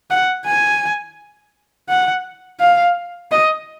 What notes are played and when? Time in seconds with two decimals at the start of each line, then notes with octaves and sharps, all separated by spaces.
0.10 F#5
0.45 G#5
1.89 F#5
2.60 F5
3.31 D#5